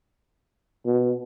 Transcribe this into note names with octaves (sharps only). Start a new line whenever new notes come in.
B2